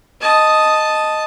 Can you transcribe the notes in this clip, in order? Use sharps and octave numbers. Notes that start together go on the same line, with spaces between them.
D#5 A5